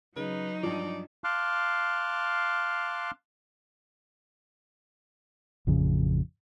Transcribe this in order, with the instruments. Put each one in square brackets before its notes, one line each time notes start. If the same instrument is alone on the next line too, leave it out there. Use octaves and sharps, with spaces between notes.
[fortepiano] C#3 [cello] F#3 D#4 [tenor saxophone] B4
[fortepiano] G2 F3 [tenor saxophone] D5
[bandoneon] F5 A5 C6 D6 F6 F#6
[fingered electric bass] A1 F2 C#3